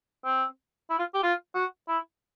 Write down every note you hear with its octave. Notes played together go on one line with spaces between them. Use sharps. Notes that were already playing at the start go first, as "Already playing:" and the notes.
C4
E4
F4
G4
F4
F#4
E4